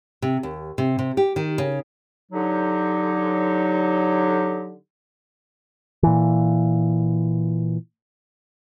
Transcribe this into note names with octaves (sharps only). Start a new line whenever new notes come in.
C3
D#2
C3
C3
G4
D#3
C#3
D3 F#3 D#4 G4
A#2 E3